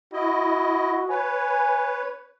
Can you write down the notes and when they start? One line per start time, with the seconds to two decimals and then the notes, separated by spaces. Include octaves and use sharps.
0.13 E4 F#4 D#5
1.09 B4 C#5 G#5